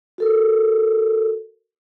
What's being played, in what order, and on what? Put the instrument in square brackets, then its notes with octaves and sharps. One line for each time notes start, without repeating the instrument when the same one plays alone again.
[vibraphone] F#4 A4 A#4